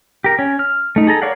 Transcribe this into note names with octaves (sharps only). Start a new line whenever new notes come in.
G4 A#4
C#4
F6
A3 D#4
G#4 A4 A#5
A#4 C#5 D5 F5 F#5